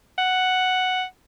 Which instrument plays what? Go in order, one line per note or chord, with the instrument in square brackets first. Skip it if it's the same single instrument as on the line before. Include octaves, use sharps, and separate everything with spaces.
[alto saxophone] F#5